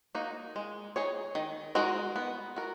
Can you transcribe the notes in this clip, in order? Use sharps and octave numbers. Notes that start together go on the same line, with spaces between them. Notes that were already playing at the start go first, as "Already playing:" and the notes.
A#3 D#4 F#4
G#3
D#4 G#4 C#5
D#3
G#3 D#4 F#4 A#4
B3
F#4 A#4